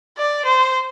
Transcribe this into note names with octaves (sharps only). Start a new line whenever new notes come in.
D5
C5